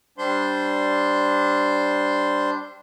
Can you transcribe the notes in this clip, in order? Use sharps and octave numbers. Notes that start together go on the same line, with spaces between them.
G3 D4 C5 C6